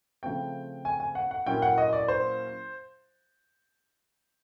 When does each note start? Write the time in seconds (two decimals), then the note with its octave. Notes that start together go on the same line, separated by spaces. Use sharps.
0.23 C#3 F3 A3 C4 G5
0.85 G#5
1.00 G#5
1.15 F#5
1.31 F#5
1.46 A#2 F#3 A#3 C#4 E4 G5
1.62 F#5
1.78 D#5
1.93 D5
2.08 C5